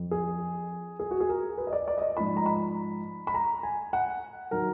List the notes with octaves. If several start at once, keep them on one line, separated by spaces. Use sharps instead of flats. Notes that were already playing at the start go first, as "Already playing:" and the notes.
Already playing: F2 F3
G#4
G#4
F#4
G#4
A#4
B4
D#5
D5
D5
D#5
D5
G#2 F3 B5
A#5
B5
B5
A#5
G#5
F#5
D#3 F#3 A#4